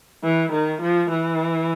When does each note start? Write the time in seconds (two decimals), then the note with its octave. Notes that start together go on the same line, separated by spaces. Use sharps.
0.24 E3
0.52 D#3
0.82 F3
1.10 E3